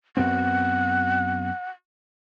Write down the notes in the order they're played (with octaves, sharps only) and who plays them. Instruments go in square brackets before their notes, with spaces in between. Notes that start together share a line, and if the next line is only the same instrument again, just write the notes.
[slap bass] F#2 B3 C4 [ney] F#5